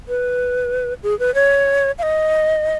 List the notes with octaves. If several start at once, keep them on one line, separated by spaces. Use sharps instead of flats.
B4
G#4
B4
C#5
F5
D#5